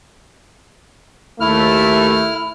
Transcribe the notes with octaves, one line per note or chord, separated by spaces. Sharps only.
D#2 A3 E4 F6